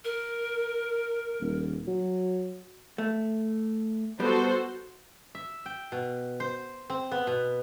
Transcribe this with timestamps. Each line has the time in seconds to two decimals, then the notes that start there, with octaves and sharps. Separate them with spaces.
0.05 A#4
1.40 D#1
1.87 F#3
2.98 A3
4.20 G3 B3 F#4 A4 C5
5.35 E5
5.66 G5
5.92 B2
6.40 C5
6.90 C4
7.11 B3
7.27 B2